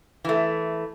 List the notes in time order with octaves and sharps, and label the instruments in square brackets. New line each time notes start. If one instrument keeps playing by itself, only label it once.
[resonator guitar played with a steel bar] E3 A3